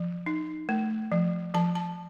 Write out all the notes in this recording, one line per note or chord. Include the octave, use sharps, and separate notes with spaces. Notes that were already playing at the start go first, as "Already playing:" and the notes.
Already playing: F3
D#4
A3
F3
F3 A5
A5